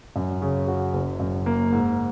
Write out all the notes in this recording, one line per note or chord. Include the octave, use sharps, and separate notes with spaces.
F#2
C#3
F#4
F#1
F#2
A#3
G#2